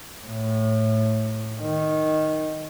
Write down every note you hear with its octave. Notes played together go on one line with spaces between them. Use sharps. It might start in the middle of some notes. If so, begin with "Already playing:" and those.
A2
D#3